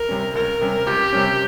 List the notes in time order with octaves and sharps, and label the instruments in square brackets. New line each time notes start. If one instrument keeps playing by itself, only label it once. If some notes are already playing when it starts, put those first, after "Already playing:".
Already playing: [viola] A#4
[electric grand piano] C3 G3 C#4
[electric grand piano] C#2 [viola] A#4
[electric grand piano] C3 G3 C#4
[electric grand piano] C#2 [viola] G4
[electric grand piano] C3 G3 C#4